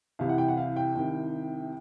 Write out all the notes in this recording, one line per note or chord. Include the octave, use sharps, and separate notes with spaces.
C2 C3 E3 F5
F#5
G5
F#5
F5
G5
C2 C3 D#3